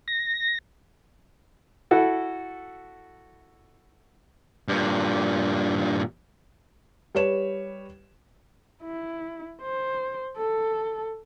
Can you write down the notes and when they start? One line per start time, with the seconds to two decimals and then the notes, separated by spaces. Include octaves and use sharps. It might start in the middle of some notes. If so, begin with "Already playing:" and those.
0.08 A#6
1.91 E4 F#4 A4
4.68 G2 A#2
7.15 G3 B4 C#5 E7
8.83 E4
9.62 C5
10.37 A4